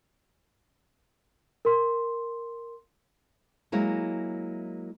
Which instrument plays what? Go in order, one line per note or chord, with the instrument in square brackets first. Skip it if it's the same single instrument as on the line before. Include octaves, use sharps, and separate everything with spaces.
[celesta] A#4 C6
[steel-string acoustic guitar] F#3 G#3 A#3 E4